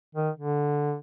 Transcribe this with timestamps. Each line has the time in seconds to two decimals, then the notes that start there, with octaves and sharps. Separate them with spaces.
0.15 D#3
0.37 D3